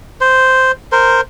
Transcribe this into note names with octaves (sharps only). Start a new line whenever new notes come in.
C5
A#4 C5